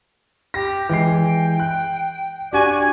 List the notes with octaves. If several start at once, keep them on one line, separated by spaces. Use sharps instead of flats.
G4 A#6
E3 G#3 G5 C7
F#6
D4 F#4 G4 D5 G#5